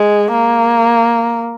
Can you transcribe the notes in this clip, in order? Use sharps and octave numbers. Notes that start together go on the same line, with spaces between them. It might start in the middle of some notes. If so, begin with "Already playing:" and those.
Already playing: G#3
A#3